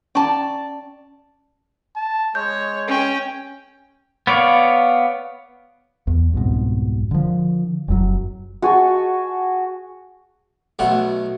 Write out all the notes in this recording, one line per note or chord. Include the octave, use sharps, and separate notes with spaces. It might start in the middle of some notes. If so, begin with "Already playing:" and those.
C#4 D5 A5 C#6
A5
G#3 C#5 G6
C#4 G5
B3 C#5 D5 F5 C#6
E2
C2 F2 G#2 B2
D3 F3
F1 F#2 A#2 F#3
F#4 G#4 A5 C#6
B1 B2 A3 F#5